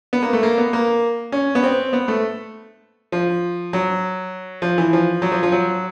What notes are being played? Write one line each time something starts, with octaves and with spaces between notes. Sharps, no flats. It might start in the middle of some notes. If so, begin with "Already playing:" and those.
B3
A#3
A3
A#3
B3
A#3
C#4
B3
C4
B3
A3
F3
F#3
F3
E3
F3
F#3
F3
F3
F#3